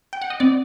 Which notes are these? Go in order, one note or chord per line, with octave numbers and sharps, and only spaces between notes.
G5
F#5
D#5
C4 D5